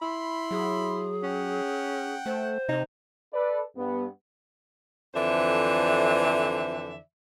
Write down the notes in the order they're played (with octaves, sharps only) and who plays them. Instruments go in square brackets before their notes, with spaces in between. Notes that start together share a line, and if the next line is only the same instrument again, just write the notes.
[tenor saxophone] E4 [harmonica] B5 C6
[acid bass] F#3 [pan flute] G#4
[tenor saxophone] C#4 [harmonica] F#5 G5
[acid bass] A3 [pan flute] C5
[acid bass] C3 [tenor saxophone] D#4
[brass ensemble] A4 B4 D5
G2 B3
[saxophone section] F2 D3 E3 C5 D5 E5